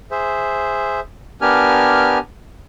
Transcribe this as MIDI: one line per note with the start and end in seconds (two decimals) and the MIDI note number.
0.11 1.00 68
0.11 1.00 72
0.11 1.00 76
1.42 2.18 59
1.42 2.18 62
1.42 2.18 67
1.42 2.18 70
1.42 2.18 80
1.42 2.18 89